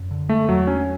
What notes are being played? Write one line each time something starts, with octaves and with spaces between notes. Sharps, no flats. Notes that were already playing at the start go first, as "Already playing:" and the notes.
Already playing: F#2
D3
G#3 A3
E2 F#3
C#4 D4